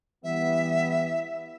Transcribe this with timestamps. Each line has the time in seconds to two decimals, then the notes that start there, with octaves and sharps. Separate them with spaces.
0.24 E3 G3 B3 E5